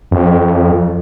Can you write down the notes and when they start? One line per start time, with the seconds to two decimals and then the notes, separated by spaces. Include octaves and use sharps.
0.11 F2